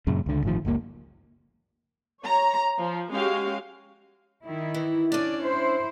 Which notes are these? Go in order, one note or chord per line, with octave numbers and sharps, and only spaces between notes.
F#2 A#2 C#3
C#2 D3
G1 A2 D#3 F3
F#1 C#2 C#3 A#3
C#5 A#5
F3
G#3 C#4 F#4 G4 F5
D#3 E4
E3
C#4 D4 D5
E4 C5